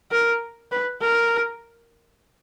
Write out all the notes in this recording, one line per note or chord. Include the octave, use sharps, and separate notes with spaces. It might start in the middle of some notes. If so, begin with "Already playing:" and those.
A#4
B4
A#4